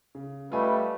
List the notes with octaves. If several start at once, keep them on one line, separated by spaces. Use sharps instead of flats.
C#3
G3 A3 F4 B4 D#5 G#5